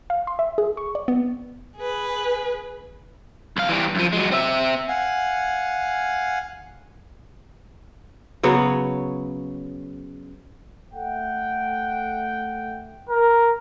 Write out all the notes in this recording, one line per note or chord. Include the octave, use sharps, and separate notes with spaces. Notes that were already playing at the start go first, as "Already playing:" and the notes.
F5
C6
E5
G#4
C#6
D5
B3
G#4 B4
C2 F5
E3 G3
F#2 F3
F#3 G#3
C4 E5
F5 F#5 G#5
C#3 F#3 B3 C#5
A3 F#5 G5
A#4